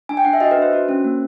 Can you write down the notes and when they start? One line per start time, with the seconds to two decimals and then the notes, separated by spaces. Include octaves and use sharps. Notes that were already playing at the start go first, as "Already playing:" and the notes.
0.09 D4 G#5
0.17 G5
0.25 D4 F#5
0.33 E5
0.40 F#4 D#5
0.51 B4
0.57 D4 C5
0.73 F#4
0.89 C#4
1.04 A#3